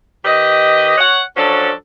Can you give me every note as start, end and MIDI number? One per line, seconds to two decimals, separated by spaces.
0.24 0.94 51
0.24 0.94 67
0.24 0.94 71
0.24 0.94 75
0.97 1.21 73
0.97 1.21 78
1.37 1.72 53
1.37 1.72 54
1.37 1.72 61
1.37 1.72 62
1.37 1.72 69